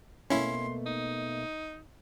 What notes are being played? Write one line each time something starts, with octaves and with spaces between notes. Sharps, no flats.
B2 A3 A#3 C#4 E4 C6
D#4